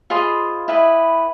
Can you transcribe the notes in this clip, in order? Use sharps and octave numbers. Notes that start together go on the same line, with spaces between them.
F4 G#4 C5 D#5 B5
E4 G4 B4 D#5